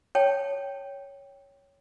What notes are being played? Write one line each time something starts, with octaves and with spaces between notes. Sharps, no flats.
C#5 G5 A5